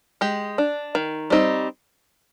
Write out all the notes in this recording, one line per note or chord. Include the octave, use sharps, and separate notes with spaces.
G#3 G4
D4
D#3
G3 C4 D#4